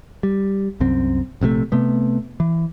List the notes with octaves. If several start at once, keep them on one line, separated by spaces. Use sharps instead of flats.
G3
C2 F#2 C4
A#1 C3 E3 A3
C3 A3 B3
E3